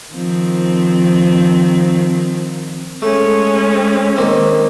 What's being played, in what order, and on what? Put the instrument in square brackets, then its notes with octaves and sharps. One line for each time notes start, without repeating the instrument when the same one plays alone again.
[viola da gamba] D#3 F3 C4
[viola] G#3 C#4 [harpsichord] A3
[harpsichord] D#3 A#3 C4